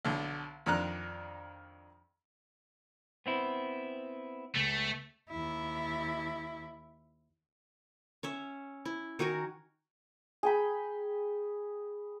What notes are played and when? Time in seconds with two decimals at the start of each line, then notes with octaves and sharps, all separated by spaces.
0.05 B1 D3
0.66 F2 D#3 D4 A#5 F#6
3.26 B3 C4 E4
4.56 C#2 A3
5.30 D#2 E4
8.23 C#4 C#5 E5
8.85 E4
9.19 D#3 F#4 A#4 G#5
10.43 G#4 G5 B5